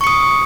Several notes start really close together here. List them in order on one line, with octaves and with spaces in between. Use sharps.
C#6 C#7 D#6